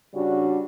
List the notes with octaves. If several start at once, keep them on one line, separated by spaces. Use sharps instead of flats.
C#3 G3 D4 F#4